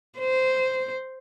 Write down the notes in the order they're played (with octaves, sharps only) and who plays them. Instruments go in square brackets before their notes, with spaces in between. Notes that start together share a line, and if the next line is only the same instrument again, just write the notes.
[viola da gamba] C5